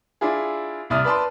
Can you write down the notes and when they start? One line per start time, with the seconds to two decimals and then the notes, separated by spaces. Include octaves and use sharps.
0.21 D4 E4 F4 G#4
0.90 C2 E4 D5 D#6 F6
1.04 B4 D5 A5 C6